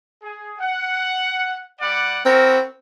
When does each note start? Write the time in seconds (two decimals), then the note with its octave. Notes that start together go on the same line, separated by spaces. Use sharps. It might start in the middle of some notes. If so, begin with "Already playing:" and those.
0.23 G#4
0.60 F#5
1.81 G3 D5 F#5
2.25 C4 E4 F#4 A#4